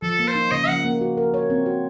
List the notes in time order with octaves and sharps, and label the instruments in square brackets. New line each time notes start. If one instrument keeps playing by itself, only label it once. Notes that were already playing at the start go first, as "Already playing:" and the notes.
[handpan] F3 [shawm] A4
[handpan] A#3
[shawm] C5
[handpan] D#4
[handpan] C#3 [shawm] D#5
[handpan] F3 [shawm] F#5
[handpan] A#3
F#4
A#4
C#5
C4
F#4